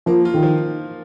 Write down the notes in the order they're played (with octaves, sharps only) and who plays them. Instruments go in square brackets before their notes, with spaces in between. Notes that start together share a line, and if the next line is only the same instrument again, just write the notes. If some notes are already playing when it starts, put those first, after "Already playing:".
[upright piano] F3 [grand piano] A#3
[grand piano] F4
[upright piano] D#3
[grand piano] F3